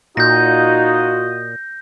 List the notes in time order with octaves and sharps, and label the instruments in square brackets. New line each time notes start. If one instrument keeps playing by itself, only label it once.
[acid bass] A#2 [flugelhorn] D#4 [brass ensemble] F4 F#4 D#5 [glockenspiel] G6 A#6